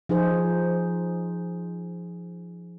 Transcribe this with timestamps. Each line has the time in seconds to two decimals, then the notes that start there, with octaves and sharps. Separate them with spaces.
0.09 F3 D#4 G#4 C5